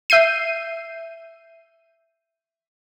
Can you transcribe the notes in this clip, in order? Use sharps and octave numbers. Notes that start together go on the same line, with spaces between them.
E5 G6 C7 D#7